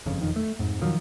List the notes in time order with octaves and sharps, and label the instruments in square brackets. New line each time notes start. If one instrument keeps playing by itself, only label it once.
[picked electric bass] G1 F2 C#3
E1 F2 D#3
A3
F2 G#2
B2 D#3 F3 F#3